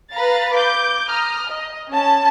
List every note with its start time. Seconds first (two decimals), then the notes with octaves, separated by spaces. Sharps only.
0.12 B4 F5 A#5 A6
0.55 D6 G6
1.08 A#5 D#6 F6
1.49 D#5
1.90 C#4 A5